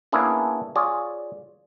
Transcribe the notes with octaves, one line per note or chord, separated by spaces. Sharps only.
A#3 B3 C#4 D4 E4 G#4
F4 G#4 C#5 D5